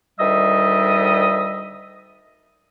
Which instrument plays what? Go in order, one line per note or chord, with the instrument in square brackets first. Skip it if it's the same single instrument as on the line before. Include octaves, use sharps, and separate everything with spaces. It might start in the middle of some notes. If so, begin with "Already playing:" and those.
[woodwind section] D2 D#3 G3 D#5 E5 D#6